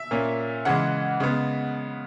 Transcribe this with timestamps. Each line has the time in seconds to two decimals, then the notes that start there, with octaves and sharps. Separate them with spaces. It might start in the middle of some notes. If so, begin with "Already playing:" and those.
Already playing: E5
0.11 A#2 A#3 C#4
0.65 C#3 E3 G#3 F#5
1.20 C#3 G#3 B3